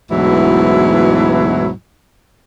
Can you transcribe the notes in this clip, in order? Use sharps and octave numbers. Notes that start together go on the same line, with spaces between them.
D2 G#2 B2 E3 F#3 E4